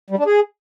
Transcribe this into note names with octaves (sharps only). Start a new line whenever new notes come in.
G3
D4
G#4